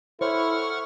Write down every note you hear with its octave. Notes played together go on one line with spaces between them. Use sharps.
E4 A4 C5 C#5 F#5 C#6 F6